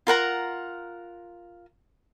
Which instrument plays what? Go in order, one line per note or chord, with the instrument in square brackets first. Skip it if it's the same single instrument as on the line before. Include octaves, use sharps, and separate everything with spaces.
[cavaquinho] F4 A#4 F#5 A#5